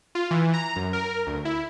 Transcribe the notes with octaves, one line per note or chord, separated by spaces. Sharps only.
F4
E3
A#5
F#2
A#4
D2
E4